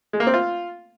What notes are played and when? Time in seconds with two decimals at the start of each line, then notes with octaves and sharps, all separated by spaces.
0.13 G#3
0.20 A#3
0.27 C4
0.34 F4